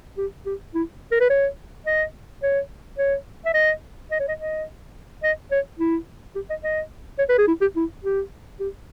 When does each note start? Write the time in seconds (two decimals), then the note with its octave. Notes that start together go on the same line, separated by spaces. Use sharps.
0.17 G4
0.46 G4
0.74 E4
1.12 A#4
1.21 B4
1.30 C#5
1.86 D#5
2.43 C#5
2.98 C#5
3.46 E5
3.54 D#5
4.11 D#5
4.20 C#5
4.28 D#5
4.38 D#5
5.23 D#5
5.51 C#5
5.79 E4
6.35 G4
6.50 D#5
6.64 D#5
7.19 C#5
7.29 B4
7.38 G#4
7.48 E4
7.61 G4
7.76 E4
8.04 G4
8.60 G4